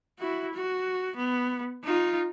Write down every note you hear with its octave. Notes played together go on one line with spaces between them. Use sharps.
E4 F#4
F#4
B3
D#4 F4